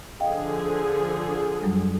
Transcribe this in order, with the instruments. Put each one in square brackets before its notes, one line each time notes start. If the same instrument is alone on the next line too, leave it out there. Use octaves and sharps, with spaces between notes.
[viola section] D3 F3 G#4 [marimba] D#5 F5 G5
[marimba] F#2 F#3 G3